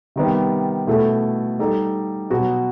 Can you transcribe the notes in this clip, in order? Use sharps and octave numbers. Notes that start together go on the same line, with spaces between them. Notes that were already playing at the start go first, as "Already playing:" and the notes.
C3 D#3 G3 B3
B2 A3 E4 A4
G3 D#4 A4
B2 F#3 B3 F#4